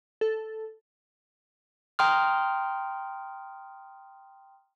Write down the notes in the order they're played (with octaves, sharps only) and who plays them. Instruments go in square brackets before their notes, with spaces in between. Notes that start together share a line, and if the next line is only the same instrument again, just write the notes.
[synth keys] A4
[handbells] G5 A#5 C6 D#6 F6